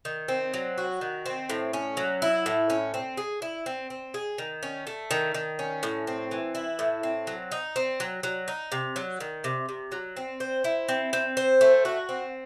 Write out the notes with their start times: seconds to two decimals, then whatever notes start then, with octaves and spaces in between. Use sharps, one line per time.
0.05 D#3
0.28 C4
0.54 F#3
0.78 F#4
1.01 D#3
1.26 C4
1.49 A2
1.73 C#4
1.97 F#3
2.22 E4
2.46 A2
2.70 C#4
2.94 C4
3.17 G#4
3.42 E4
3.66 C4
3.90 C4
4.14 G#4
4.38 D#3
4.63 C#4
4.87 A3
5.11 D#3
5.34 D#3
5.59 C#4
5.83 A2
6.07 C4
6.31 E3
6.55 E4
6.79 A2
7.03 C4
7.27 F#3
7.52 D#4
7.76 C4
8.00 F#3
8.23 F#3
8.48 D#4
8.72 C3
8.96 F#3
9.20 D#3
9.44 C3
9.69 C3
9.92 F#3
10.17 C4
10.40 C5
10.64 E4
10.89 C4
11.13 C4
11.37 C5
11.61 A3
11.85 F#4
12.09 C4